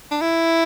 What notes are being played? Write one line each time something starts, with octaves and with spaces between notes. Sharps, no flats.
D4
E4